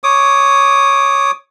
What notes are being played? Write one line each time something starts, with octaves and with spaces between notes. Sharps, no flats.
C#5 D6 D#6